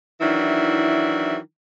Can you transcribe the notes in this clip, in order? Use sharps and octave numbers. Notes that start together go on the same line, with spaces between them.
D#3 E3 F#3 D4 E4